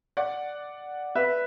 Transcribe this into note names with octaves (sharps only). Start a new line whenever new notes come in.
D5 F#5
B4 E5